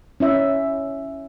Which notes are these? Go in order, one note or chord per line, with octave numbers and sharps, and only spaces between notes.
C#4 E4 E5